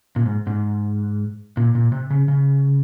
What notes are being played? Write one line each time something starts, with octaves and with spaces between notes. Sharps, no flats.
A#2
G#2
G#2
A#2
A#2
C3
C#3
C#3